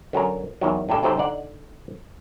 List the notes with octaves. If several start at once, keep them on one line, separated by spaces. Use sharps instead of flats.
D3 F#3 C#4 A#4
E2 D#3 F#3
A2 D4 G4 A4 G5
C3 F#3 C4 D#4 A4 C5
D3 D#4 D5 F#5